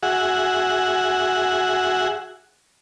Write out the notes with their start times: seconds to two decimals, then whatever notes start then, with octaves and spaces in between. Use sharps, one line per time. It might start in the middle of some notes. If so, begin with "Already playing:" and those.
0.03 F#4 G#4 E5 F#5